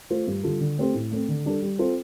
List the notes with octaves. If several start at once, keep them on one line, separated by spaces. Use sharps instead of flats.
A3 F4 C5
G2
D3 G3 F4 A4
D3
A3 C4 G4 C5
A2
A3 C4
D3
G3 D4 A4
G3
C4 F4 A4 C5